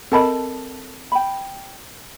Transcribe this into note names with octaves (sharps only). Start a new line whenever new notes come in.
C4 A4 A#4 D#5 A5 B5
G5 B5